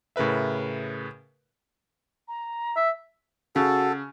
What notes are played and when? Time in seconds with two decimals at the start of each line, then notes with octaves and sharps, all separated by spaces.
0.16 A2 C#3 A#4 B4 E5
2.28 A#5
2.76 E5
3.56 C#3 F#4 A4